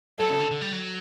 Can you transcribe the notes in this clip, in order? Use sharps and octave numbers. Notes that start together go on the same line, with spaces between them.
F#3 A4
C#3
D3
D3
G3
F#3